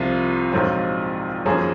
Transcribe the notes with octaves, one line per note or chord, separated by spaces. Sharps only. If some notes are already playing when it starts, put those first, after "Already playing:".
Already playing: C2 C3 F3 F4
A#1 G#2 F#3 C4
G#1 F#2 F3 A#3 C#4 G#4